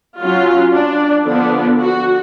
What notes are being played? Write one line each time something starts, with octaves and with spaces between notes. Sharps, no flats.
F#3 C#4 F4
D4
D3 F3 B3 D4
F#4